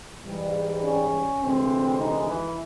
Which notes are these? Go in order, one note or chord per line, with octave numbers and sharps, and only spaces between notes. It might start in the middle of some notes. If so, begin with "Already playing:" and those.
G#2 E3 G3
C#4
D2 C3 E3 G#3 C4
D#3 D#4
E3 E4